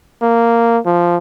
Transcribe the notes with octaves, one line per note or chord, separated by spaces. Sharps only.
A#3
F3